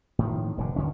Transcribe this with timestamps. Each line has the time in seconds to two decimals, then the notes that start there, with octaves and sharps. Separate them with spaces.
0.19 A2 D#3 F3
0.58 F1 A#2 D3
0.76 D#2 D3 C#4